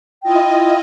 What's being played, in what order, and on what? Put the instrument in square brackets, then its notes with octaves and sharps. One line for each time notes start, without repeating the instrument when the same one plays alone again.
[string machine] E4 F4 D#5 [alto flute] G5